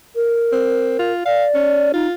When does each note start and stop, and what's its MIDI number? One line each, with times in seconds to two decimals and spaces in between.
0.16 1.12 70
0.52 0.98 60
0.99 1.23 65
1.26 1.91 74
1.26 1.46 77
1.54 1.92 61
1.94 2.08 63
1.94 2.14 65